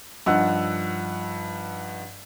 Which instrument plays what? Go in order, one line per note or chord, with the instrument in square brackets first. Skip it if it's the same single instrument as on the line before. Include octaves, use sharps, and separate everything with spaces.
[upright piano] G2 F3 D#4 F#5 E6 F#6